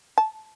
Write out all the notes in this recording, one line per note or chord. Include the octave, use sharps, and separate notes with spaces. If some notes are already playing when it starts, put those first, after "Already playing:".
A5